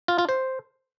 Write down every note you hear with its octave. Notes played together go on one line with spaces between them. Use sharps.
F4
F4
C5